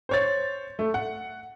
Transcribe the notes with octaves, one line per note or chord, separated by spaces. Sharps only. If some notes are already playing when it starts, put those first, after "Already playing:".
C5 C#5 A6
A3
F#5